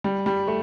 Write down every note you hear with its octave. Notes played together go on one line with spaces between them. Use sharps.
G3
G3
A3